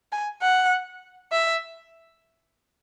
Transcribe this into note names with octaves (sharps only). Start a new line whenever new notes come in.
G#5
F#5
E5